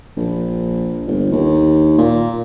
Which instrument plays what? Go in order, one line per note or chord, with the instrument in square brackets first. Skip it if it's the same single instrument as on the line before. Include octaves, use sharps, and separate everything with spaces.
[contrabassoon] A#1
G1
D#2
A#2